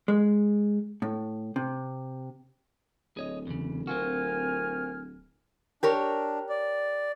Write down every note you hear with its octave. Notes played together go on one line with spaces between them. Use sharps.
G#3
A2
C3
D1 G#4 C#5 D#5
E2 C#3
C4 F4 F#4 A#4 G#5 F6
D4 G4 A#4 C#5
D5